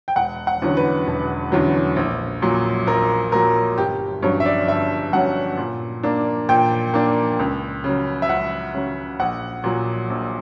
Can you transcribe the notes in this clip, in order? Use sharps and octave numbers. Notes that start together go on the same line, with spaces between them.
G5
E1 F#5
F#5
E2 D3 F#3 C#4
B4
E1
E2 D3 F#3 C#4
A#1
A#2 F#3
A#1 A#4
A#2 F#3 A#4
G1 G4
G2 F#3 C#4 C#5
E5
D5
G1 E5
G2 F#3 C#4 F#5
A#2
A#3 D4
A#2 G5
A#3 D4
C#2
C#3 F#3
E5
C#2 F#5
C#3 F#3
A#1 F#5
A#2 F#3
A#1